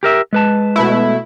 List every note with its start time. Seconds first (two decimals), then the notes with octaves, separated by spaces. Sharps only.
0.03 G4 A#4 E5
0.33 G#3 B4 A5
0.76 B2 A3 E4